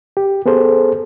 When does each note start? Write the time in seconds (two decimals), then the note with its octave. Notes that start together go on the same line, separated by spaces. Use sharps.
0.17 G4
0.46 B3 G#4 A4 C5